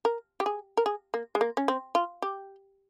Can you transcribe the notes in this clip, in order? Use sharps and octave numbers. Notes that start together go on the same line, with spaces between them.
A#4
G4
G#4
A#4
G#4
A#3
G#3
A#3
C#4
C4
F4
G4